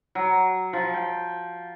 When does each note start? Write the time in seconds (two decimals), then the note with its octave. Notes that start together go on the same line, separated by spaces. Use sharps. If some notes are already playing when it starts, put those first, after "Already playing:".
0.15 F#3
0.73 F3
0.94 G5